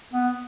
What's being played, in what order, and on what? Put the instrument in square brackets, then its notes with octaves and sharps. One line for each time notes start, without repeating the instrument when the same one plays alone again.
[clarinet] B3